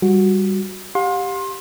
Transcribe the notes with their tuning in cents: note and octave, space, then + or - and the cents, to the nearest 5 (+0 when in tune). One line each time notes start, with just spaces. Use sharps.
G3 +0 F#4 -10
G4 +0 F5 +45 C6 +25